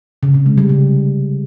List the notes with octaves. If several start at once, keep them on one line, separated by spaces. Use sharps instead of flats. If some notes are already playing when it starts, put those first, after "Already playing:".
C#3
C3
G#3
G3
C#3